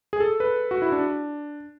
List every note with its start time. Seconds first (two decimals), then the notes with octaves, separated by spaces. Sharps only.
0.13 G#4
0.20 A4
0.40 B4
0.71 F#4
0.82 E4
0.92 D4